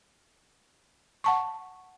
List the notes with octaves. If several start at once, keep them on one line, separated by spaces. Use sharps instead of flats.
F#5 A5 C#6